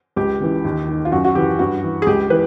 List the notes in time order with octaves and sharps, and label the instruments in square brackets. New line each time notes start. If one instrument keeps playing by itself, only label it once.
[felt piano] C#2 G4
C#3 E3
D#2
D#3
F4
F#2 F#4
F#4
C#3 E3 G4
G2 F#4
E3
G#4
C#2 G4
E3 B4